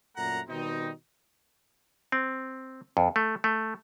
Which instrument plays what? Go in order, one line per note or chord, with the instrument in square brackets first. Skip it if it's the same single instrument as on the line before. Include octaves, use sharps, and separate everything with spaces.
[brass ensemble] F#2 A#2 A3 F#5 A#5
B2 D#3 G3 C4 D#4
[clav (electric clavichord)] C4
F2
A3
A3